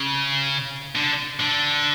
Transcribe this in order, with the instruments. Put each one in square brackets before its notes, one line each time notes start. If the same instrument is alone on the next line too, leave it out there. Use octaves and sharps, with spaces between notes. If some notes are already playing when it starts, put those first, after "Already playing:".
Already playing: [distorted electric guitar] C#3
D3
D3